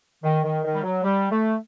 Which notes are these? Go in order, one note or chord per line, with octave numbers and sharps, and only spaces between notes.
D#3
D#3
D#3
G3
F#3
G3
A3